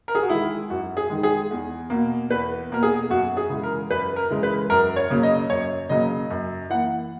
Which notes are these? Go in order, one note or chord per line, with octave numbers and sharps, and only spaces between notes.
A#4
G#4
F#4
D#3 G#3 E4
F#2 F#4
G#4
D#3 G#3
G#4
E2
B2 A#3
E2 B4
B2 A#3 A#4
G#4
F#2 F#4
G#4
C#3 E3 G#3
A#4
F#2 B4
A#4
C#3 E3 G#3
B4
F#2 A#4
C#5
C#3 F#3 A#3
D#5
F#2 C#5
C#3 F#3 A#3 D#5
F#2
E3 A#3 F#5